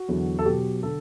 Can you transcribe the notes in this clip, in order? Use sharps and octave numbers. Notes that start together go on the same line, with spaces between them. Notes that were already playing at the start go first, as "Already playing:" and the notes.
Already playing: F#4
E2 D3 F#3
A4
B2 F#3 G4
D3 A4